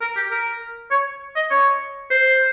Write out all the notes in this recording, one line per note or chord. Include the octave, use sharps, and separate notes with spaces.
A#4
G4
A#4
C#5
D#5
C#5
C5